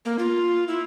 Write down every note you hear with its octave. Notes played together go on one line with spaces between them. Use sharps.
A#3
F4
E4